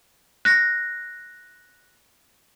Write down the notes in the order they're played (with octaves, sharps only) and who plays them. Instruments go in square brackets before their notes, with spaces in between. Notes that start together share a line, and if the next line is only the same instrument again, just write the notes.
[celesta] F#6 A#6